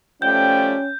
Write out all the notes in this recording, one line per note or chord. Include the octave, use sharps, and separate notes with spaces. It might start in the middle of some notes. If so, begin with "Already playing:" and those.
F3 G3 A3 C#4 G5 G6